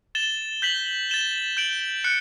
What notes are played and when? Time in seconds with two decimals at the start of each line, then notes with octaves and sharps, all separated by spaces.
0.15 A6 E7 G7
0.62 G6 B6 F#7
1.10 A6 E7 G7
1.57 G6 D7 F#7
2.04 F#6 C#7